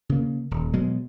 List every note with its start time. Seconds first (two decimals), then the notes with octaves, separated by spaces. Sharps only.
0.09 C#3 A#3
0.51 D#1
0.73 B2 F#3 G#3